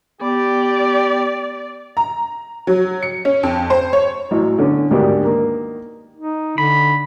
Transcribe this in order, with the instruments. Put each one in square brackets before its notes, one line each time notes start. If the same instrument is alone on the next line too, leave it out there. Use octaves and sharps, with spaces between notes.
[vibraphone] B3 [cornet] G4 [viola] D5
[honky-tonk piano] A#5
F#3
C#7
C#4
F2
C5
C#5
[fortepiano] A1 F#3
D3 B3 C#4
D2 G#2 D#3 B3 D4 G4
D#3 A#3
[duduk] D#4
[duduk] D3 [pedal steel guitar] B5